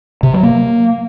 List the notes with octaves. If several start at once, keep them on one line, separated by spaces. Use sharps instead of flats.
C3
F#3
A#3